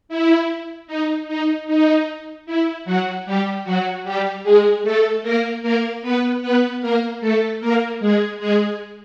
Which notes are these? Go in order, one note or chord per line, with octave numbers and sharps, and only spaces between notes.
E4
D#4
D#4
D#4
E4
F#3 F#4
G3 G4
F#3 F#4
G3 G4
G#3 G#4
A3 A4
A#3 A#4
A#3 A#4
B3 B4
B3 B4
A#3 A#4
A3 A4
A#3 A#4
G#3 G#4
G#3 G#4